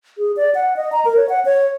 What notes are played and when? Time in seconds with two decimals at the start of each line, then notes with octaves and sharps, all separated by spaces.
0.18 G#4
0.37 D5
0.55 F#5
0.76 D#5
0.92 A#5
1.05 A#4
1.17 C#5
1.29 F#5
1.45 C#5